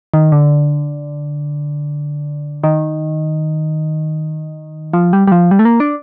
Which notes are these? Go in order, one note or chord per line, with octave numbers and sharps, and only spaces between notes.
D#3
D3
D#3
F3
G3
G3
F3
G3
A3
A#3
D4